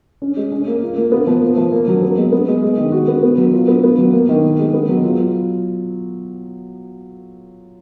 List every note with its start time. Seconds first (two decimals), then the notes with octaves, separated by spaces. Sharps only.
0.22 C#4
0.37 G#3
0.52 C#4
0.67 A#3
0.82 F4
0.97 A#3
1.12 B3
1.27 F3
1.42 A#3
1.57 F3
1.72 A#3
1.88 F#3
2.02 B3
2.17 G#3
2.32 B3
2.48 G#3
2.62 G#3
2.77 D#3
2.92 F#4
3.08 B3
3.23 B3
3.38 F#3
3.53 F4
3.68 B3
3.84 B3
3.98 F#3
4.13 A#3
4.29 D#3
4.43 B3
4.59 G#3
4.74 B3
4.88 F#3
5.04 F4